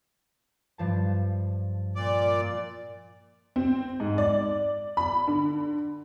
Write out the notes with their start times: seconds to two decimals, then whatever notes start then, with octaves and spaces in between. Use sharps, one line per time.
0.78 G2 F3 A5
1.95 A#2 D5
3.56 C4
4.00 G#2
4.18 D5
4.97 B5
5.27 D3